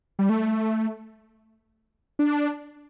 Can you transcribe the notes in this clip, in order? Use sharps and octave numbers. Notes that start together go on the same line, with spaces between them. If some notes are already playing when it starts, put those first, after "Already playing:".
G3
A3
D4